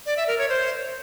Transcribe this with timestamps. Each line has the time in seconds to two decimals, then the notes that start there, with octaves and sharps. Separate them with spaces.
0.06 D5
0.17 E5
0.28 A#4
0.38 C#5
0.49 C5